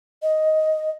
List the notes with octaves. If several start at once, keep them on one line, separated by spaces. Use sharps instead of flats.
D#5